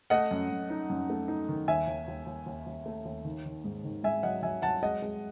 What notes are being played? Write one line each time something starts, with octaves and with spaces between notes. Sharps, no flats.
A3 D#5 F#5
F#2
F#2
D#4
F#2
A3
D#4
D#3
D#2 E5 G#5
D#2
D#2
D#2
D#2
D#2
A3
D#2
D#3
D#3
G#2
D#3
G#2 E5 G#5
F#3 D#5 F#5
F#3 E5 G#5
F#3 F#5 A5
G#3 D#5 F#5
G#3